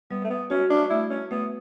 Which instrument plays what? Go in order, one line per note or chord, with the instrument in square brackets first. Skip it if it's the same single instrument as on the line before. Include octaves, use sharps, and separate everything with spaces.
[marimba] G3 [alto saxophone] B3
[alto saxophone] A3
B3
[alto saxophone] C#4 [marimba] F#4
[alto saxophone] D4
[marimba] A3 [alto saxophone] E4
[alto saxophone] C#4
[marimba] A3 [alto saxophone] B3